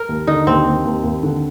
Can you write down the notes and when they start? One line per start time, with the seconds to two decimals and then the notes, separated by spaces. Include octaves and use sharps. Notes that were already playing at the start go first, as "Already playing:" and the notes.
Already playing: A#4
0.09 D#2
0.27 D3 D#4
0.46 D#2 C4
0.66 D#2
0.85 D#2
1.04 D#2
1.23 D3